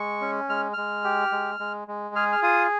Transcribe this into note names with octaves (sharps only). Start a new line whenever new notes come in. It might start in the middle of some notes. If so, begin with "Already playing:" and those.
Already playing: G#3 C#6
C#4
G#3 F6
G#3 F6
G4
G#3
G#3
G#3
G#4 F6
F6
F4 D#6